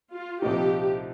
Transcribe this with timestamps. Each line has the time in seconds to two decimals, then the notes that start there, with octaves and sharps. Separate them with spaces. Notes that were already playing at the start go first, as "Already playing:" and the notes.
0.13 F4
0.42 C2 A#2 F3 A3 D#4 G4